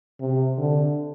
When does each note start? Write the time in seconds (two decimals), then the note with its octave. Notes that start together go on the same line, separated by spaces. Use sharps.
0.20 C3
0.57 D3